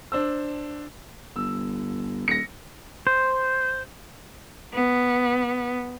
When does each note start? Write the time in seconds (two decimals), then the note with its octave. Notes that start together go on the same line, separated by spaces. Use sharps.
0.12 D4 C5 E6
1.36 G1 E6
2.28 D#1 A#6 C#7
3.07 C5
4.72 B3